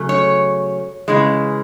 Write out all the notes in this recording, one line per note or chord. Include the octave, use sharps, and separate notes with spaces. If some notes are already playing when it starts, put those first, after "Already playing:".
Already playing: C#3 F#3 A3
C#5
C#3 E3 G#3